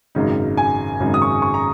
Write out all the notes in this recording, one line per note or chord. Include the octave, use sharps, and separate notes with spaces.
G#1 F#2 C#3 G#3 D#4
G#5
G#1 F#2 C#3 G#3 D#4
D#6
C#6
C#6
A#5